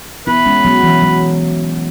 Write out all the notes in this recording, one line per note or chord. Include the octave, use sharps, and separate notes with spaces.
B3 E4 B4
G#3 C#4
F#3 B3
E3
F#3